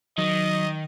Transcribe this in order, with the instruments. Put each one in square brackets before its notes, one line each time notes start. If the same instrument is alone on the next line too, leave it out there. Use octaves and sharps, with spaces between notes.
[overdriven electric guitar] D#3 [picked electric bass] F#3 [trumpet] D#5